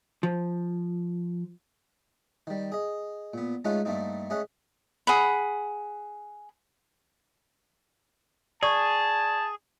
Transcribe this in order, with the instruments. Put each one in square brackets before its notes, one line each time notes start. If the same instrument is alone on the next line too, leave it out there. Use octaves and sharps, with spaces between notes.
[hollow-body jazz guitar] F3
[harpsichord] D#3 G3
G#4 D#5
A#2 B3
G#3 A3 C#4 D#4 F4 F#5
G2 A3 A#3 C4 D#4
A3 C#4 G#4 D#5 F#5
[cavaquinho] G#4 F#5 B5
[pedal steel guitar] G#4 [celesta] D5 C#6 [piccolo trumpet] A5